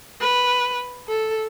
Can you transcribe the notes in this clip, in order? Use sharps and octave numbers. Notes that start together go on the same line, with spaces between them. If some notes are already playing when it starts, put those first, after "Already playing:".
B4
A4